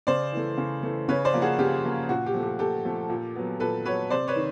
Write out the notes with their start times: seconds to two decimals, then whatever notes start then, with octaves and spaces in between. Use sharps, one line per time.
0.07 C#3 C5 D5
0.32 E3 A3
0.58 C#3
0.83 E3 A3
1.09 C#3 B4 C#5
1.25 C5 D5
1.34 F3 A#3
1.42 F#4 G#4
1.59 C#3 G4
1.84 F3 A#3
2.09 A#2 F#4
2.26 G4
2.34 F3 A3
2.43 G4
2.59 A#2 G4 A4
2.85 F3 A3
3.09 A#2
3.35 F#3 B3
3.60 A#2 A4 B4
3.85 F#3 B3 B4 C#5
4.10 C3 C5 D5
4.28 B4 C#5
4.36 D#3